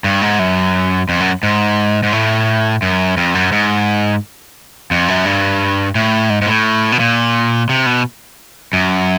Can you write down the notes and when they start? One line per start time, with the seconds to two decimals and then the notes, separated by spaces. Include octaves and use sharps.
0.04 G2
0.22 G#2
0.39 F#2
1.09 F2
1.20 F#2
1.43 G#2
2.03 G#2
2.13 A2
2.82 F#2
3.17 F2
3.35 F#2
3.52 G#2
4.91 F2
5.08 F#2
5.25 G2
5.95 A2
6.30 G#2
6.41 G#2
6.47 A2
6.92 B2
6.99 A#2
7.69 C3
7.86 B2
8.73 F#2